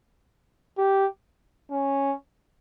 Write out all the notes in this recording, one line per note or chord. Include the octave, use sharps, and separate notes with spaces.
G4
C#4